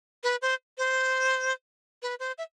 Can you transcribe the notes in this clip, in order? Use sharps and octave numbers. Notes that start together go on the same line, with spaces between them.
B4
C5
C5
B4
C5
E5